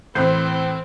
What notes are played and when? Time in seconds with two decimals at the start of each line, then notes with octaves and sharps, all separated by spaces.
0.15 A2 E3 C4 C5